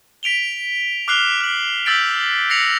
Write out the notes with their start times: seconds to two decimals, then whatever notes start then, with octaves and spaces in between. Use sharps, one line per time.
0.23 B6 D7 F7 G7
1.08 D6 F6 F#6 C7 F7 G7
1.41 F6 F#7
1.86 E6 G6 A6 B6 D7
2.50 G6 A#6 C7 C#7 F7 F#7